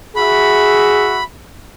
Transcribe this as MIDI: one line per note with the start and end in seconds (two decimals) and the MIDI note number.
0.16 1.19 66
0.16 1.19 68
0.16 1.19 76
0.16 1.24 83